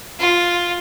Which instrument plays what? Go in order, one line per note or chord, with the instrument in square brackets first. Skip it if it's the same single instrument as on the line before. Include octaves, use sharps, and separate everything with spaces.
[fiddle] F4